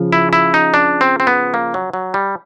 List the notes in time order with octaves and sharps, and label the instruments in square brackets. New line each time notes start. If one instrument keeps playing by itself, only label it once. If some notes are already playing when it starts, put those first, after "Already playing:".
Already playing: [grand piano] C#3 F3
[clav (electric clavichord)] E4
E4
D#4
D4
C4
C4
B3
A#3
F#3
F#3
G3